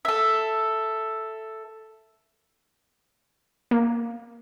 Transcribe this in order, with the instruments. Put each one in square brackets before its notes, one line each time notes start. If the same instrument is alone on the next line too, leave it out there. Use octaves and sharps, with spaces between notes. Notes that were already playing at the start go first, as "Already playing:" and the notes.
[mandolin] A4 E5
[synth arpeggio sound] A#3